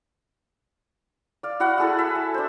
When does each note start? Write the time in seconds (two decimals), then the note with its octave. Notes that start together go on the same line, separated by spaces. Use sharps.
1.43 D5 F5
1.60 E4 F#4 F5 F#5
1.78 E4 G#4 A4
1.98 E5
2.15 A5
2.34 D4 C5